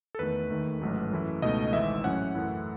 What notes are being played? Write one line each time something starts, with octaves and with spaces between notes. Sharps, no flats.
A4
E2 D#3 A3 B4
D#2 D#3 A3
A1 G#2 F#3 A3
F#2 E3 A3 E4
C#2 B2 A3 D#4 D#5
G#1 G#2 E3 E5
A2 F#3 C#4 F#5
F#2 E3 A3 E4